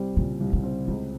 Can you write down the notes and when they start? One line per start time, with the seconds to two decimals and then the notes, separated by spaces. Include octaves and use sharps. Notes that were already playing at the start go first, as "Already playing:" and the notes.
Already playing: C2 G3 C4
0.16 A#2 C#3
0.40 C2
0.53 C#3
0.64 C4
0.88 C#2 C#3